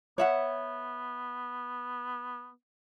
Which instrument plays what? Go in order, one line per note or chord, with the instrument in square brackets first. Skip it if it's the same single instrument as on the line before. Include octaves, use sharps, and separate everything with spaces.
[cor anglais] B3 [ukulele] C#5 E5 F#5